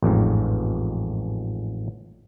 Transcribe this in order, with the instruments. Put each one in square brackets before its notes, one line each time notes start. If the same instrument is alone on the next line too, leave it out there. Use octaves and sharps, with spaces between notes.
[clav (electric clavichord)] A1 F2 G#2